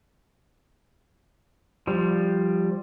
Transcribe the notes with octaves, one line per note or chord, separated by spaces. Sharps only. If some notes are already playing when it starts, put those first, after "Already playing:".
F3 G3